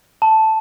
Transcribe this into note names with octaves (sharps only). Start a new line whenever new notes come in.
A5